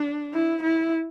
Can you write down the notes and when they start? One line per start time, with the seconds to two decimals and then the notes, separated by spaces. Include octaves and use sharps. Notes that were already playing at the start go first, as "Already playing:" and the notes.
Already playing: D4
0.34 E4
0.63 E4